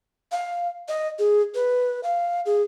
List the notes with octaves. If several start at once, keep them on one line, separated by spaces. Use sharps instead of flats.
F5
D#5
G#4
B4
F5
G#4